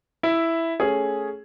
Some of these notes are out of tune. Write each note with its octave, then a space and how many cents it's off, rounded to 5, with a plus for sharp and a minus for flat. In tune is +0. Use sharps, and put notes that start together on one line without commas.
E4 +0 E5 +0
A3 +0 C#4 +0 G#4 +0